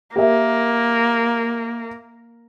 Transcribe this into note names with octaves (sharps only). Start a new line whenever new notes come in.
A#3 G4 A#4 E5